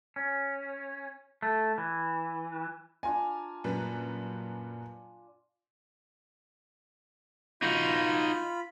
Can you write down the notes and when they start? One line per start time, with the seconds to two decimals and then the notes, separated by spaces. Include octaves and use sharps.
0.16 C#4
1.42 A3
1.78 E3
3.03 D4 F4 G#5 A#5
3.64 F#2 A#2 G3 B4
7.62 D#4 F4 F#4 B5